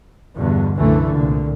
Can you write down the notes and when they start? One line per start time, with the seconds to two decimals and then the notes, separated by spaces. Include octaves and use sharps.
0.36 E2 G2 B2 D3
0.77 C2 F#2 D3 E3 A3
1.10 C2 A#2 D3